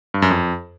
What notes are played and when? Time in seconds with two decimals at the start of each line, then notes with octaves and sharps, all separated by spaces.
0.14 G2
0.22 F#2
0.30 F2